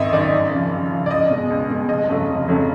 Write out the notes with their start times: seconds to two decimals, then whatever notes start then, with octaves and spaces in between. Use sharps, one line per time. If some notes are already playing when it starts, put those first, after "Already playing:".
Already playing: G#1 F#2 D#3 D#5 E5
0.12 F#2 D#3 D5
0.32 F#2
0.51 C#3 F3
0.72 F#2
0.91 C#3 F3
1.06 D5
1.10 C#2 D#5
1.30 B2 G#3
1.50 C#2
1.69 B2 G#3
1.89 F1 D#5
2.08 F2 C#3 F#3 A3
2.28 F1
2.48 F2 C#3 F#3 A3